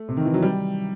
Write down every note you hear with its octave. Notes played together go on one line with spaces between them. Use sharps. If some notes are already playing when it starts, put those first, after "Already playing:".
Already playing: A3
C3
D#3
E3
F#3
G3